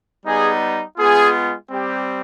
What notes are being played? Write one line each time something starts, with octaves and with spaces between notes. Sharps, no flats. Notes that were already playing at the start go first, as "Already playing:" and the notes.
G3 B3 D#4 G#4
G#3 B3 F4 G#4
G3 C4 G4